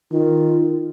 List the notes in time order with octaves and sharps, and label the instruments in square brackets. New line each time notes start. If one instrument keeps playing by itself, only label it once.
[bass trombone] D#3 [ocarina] F4